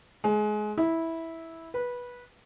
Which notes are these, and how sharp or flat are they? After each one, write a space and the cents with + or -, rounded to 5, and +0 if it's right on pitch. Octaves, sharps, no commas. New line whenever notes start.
G#3 +25
E4 -10
B4 -15